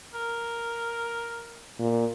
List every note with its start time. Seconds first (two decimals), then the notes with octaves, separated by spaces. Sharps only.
0.14 A#4
1.80 A#2